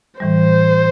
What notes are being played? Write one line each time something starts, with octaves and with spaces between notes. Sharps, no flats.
A2 E3 G3 C5